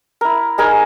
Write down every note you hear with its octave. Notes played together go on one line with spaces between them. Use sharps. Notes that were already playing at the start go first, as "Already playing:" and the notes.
E4 A#4
D#4 G#4 A#4 G#5